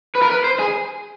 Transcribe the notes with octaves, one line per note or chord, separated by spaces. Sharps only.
B4
A#4
B4
C5
G#4